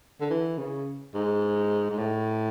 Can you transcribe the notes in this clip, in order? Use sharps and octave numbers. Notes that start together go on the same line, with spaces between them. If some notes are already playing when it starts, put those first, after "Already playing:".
D3
E3
C#3
G#2
G#2
A2